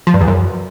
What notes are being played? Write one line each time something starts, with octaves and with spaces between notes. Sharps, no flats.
F3
G2
E2
F#2